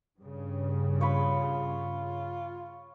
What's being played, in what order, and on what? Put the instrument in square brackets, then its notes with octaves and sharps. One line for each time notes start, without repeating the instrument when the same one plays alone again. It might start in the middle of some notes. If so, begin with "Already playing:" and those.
[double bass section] G2 C#3
[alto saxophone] F4 [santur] C#5 B5